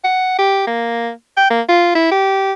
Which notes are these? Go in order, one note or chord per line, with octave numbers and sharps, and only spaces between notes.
F#5
G4
A#3
G5
A#3
F4
E4
G4